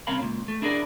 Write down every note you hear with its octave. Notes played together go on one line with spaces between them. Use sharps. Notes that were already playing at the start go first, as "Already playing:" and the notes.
C2 C4 C#4 A#4 F5 B5
C#2 A#2
A3
D4 E4 G#4 A#4 B4 D5